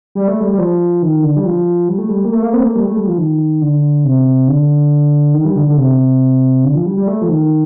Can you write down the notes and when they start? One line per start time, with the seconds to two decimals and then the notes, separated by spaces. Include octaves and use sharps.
0.15 G3
0.28 A3
0.40 G3
0.53 G3
0.58 F3
1.02 D#3
1.24 D3
1.37 G3
1.45 F3
1.89 G3
1.98 A3
2.09 G3
2.24 A#3
2.32 A3
2.42 A#3
2.53 C4
2.59 A3
2.64 A#3
2.75 G3
2.86 A3
2.96 G3
3.07 F3
3.18 D#3
3.61 D3
4.05 C3
4.48 D3
5.34 D#3
5.45 G3
5.56 D3
5.67 D3
5.78 C3
6.64 D3
6.75 F3
6.86 G3
6.97 G3
7.08 A3
7.22 F3
7.29 D#3